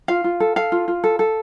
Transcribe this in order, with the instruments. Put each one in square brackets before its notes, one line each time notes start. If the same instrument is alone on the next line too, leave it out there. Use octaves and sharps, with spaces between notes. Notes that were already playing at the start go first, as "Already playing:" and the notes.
[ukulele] F4 F5
F4
A4
A4 F5
F4
F4
A4
A4